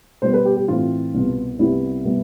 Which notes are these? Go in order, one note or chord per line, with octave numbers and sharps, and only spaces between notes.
B2 G3 B3 C5
B4
G4
G4
A2 E3 A3 C4 F4
C2 B2 B3
C2 C3 G3 B3 E4
B2 G3 B3